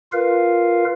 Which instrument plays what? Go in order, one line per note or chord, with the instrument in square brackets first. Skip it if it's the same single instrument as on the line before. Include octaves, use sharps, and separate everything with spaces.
[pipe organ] F4 A#4 B4 F5